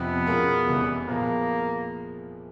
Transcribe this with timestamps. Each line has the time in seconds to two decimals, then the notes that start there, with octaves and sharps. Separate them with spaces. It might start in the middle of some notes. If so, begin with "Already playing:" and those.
Already playing: F2 C3 F3 B3
0.27 B2 G#3 C#4 F4 A#4
0.67 F1 E2 C3 E3 G3
1.08 A#2 F3 G#3 A#3 B3